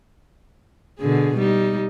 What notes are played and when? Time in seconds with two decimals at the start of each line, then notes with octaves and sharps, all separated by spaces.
0.99 B2 D3 G#4
1.38 G3 D#4